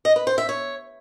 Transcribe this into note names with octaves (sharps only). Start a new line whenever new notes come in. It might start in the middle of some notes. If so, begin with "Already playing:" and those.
D#5
B4
C5
E5
C#5